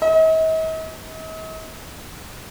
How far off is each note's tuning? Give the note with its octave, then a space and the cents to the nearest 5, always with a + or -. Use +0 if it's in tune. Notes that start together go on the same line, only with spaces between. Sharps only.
D#5 +45